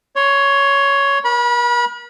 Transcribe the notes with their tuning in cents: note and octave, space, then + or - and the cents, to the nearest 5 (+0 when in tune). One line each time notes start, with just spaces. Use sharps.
C#5 +10 C6 +35
A#4 +40 B5 -30